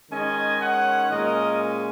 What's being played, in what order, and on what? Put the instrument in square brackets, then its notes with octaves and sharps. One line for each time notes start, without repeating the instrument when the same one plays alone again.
[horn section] D#3 G#3 C#4 D#5 G#5
C#5 F#5
A#2 G#3 C#4 A#4 D#5